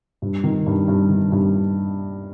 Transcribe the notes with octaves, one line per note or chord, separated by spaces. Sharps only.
G2
D#3
G2
G2
D#3
G2